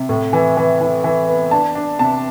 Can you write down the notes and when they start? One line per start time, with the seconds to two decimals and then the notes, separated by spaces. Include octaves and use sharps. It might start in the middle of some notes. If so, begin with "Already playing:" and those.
Already playing: C3
0.09 A2
0.33 E3
0.57 E3
0.81 E3
1.04 E3
1.28 B3
1.51 D4 A5
1.75 D4
1.99 C3 A5